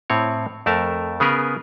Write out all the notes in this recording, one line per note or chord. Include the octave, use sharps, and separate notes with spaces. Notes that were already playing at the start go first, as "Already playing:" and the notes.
A2 C4 C#5
F2 A3 A#4 A5
C#3 B3 G#4 A#4 B4